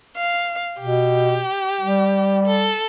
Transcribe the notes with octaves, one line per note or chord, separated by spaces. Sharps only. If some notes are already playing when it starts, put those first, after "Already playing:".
F5
B2 G4
G3
A4